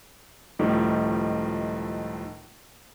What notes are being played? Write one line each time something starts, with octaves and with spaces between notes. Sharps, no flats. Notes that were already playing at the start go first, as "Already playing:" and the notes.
C#2 A2 D#3 F3 G3 A3